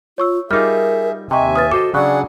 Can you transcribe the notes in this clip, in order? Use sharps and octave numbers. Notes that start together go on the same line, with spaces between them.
F4 C#5 C#6 E6
G3 D#4 F4 G#4 A#4 E5 D6 F6
D#2 C3 D#5 E5 G5 G#5 C#6
B4 D#6 F6 A6
F#4 A4 C5 D#5 D6
C#3 F#3 D4 G#4 D5 F#5 C#6 F#6